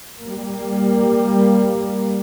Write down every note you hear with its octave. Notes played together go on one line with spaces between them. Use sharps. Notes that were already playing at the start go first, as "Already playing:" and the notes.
G3 A#3